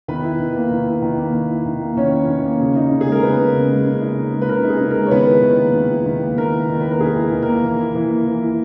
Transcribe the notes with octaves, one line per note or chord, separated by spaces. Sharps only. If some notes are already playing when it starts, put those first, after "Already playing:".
D#3 B3 B4
E4
D#3
A#3
D#3
E4
D#3
A#3
D#3
E4
D#3
A#3
D#3 C#4 C#5
E4
D#3
A#3
C#3
D#4
C#3
G#4
G#3 A#4
C#3 B3 B4
D#4
C#3
G#3
C#3
D#4
C#3
G#3
B4
C#3 A#4
D#4
G#4
C#3
A#4
G#3
C#5
D#3 B3 B4
E4
D#3
A#3
D#3
E4
D#3
A#3
D#3 A#4
E4
D#3
A#3 B4
A#4
D#3 G#4
E4
D#3
A#4
A#3
E3
E4
E3
A#3
E3
E4